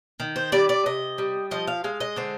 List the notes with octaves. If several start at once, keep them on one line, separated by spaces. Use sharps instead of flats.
D#3
C5
G3 D5
D5
C3 D#5
G3
F3 D#5
F5
G#3 F5
D#5
D3 C5